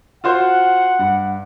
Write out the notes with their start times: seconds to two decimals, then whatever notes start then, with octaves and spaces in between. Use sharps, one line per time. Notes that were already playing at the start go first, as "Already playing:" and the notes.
0.24 F4 F#4 C5 F#5
0.99 G2